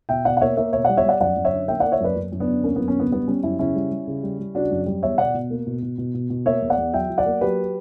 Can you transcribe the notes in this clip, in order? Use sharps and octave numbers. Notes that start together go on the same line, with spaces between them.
B2 E5 G5
B2 D5 F#5
F#5
A#3 C#5 E5
A#3 C#5 E5
B2 C#5 E5
G3 D5 F#5
C#5 E5
G3 D5 F#5
F#2 D5 F#5
F#2
C#5 E5
D3
A#3 E5 G5
A#3 D5 F#5
C#5 E5
F#2 B4 D5
F#2
F#2
B3 D4
D3
A#3 C#4
F#2 B3
C#4
D3 B3
G3 B3
G3 C#4
F#2 C#4 E4
C#3 C#4 E4
G3
G3
C#3
G3
G3
C#3 D4 F#4
F#2
G3
E2 C#5 E5
B2 D5 F#5
B2
A#3
B2
B2
B2
B2
B2
A#3 C#5 E5
E2
D5 F#5
E2
F#3 E5 G5
F#3
D5 F#5
A#3
F#3 G4 B4